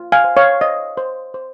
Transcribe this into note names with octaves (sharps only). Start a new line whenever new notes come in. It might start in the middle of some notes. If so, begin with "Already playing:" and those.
Already playing: F4
F5 G#5
C5
C#5 F5
C5 D#5
C5
C5